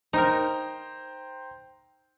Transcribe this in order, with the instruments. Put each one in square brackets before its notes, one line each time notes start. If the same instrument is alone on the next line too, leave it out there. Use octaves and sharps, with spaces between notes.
[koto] D#4 A#4 [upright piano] C5 G5 A#5